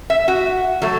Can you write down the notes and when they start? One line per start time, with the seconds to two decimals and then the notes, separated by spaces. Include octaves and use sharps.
0.10 E5
0.28 F#4
0.82 F#3 A3